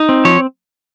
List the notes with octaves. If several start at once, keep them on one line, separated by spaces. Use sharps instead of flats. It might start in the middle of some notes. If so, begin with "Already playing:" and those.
Already playing: D#4
C4
F3 C#5